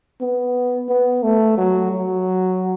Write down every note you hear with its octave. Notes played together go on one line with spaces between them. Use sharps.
B3
B3
A3
F#3
F#3